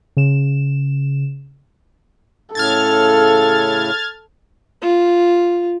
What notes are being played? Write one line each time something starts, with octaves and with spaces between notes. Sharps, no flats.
C#3 E7
A2 C#3 A4 F6 G#6 A6
F4